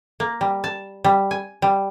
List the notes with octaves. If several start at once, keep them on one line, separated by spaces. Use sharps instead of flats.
A#3
G3
A5
G3
G#5
G3